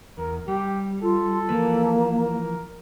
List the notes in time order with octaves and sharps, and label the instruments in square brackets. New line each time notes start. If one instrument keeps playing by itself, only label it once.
[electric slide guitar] E2 [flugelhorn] A#4
[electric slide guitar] G3 [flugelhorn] G4
[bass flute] F4 [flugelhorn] A4
[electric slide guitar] E3 F3 B4 [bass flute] A#3
[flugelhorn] A#4